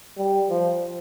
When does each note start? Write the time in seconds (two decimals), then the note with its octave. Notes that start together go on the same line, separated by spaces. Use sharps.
0.17 G3
0.50 F3